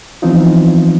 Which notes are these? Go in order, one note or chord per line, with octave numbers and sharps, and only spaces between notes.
E3 F3 B3 C4 D#4 F4